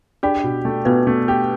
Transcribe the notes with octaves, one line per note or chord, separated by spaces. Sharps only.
D4 G4 D5
B2
A3
B2 B3 B4
A3
G4